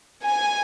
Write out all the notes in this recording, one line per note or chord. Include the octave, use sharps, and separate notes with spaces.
G#5